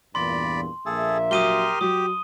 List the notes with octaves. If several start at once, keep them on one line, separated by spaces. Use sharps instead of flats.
E2 G2 A#2 D5 B5 C6
A#1 A#3 G#4 A4 E5
F#3 G4 A#4 C6 D#6 D#7 G7
F#3 G4 D#6